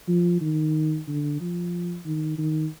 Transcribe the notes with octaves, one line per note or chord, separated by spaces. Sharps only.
F3
D#3
D3
F3
D#3
D#3